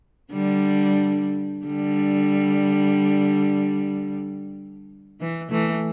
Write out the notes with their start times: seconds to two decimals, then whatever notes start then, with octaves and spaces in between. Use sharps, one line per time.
0.32 D3 G3
1.66 D3 G3
5.20 E3
5.50 E3 A3